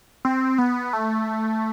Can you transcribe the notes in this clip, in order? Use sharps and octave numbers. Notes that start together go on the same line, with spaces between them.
C4
B3
A3